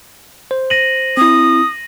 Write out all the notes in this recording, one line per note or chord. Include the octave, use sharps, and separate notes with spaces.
C5
A#6 D#7 F#7
C4 E4 D#6